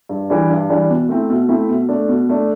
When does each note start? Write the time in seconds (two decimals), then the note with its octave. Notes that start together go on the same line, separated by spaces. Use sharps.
0.09 G2
0.30 E3 G3 D4
0.50 G2
0.70 E3 G3 D4
0.90 B2
1.09 A3 C4 E4
1.30 B2
1.48 A3 C4 E4
1.70 B2
1.89 A3 D4
2.08 B2
2.29 A3 D4